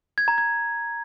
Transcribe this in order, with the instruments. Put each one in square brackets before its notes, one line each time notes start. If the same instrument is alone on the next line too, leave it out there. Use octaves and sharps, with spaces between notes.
[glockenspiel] G#6
A#5
G#6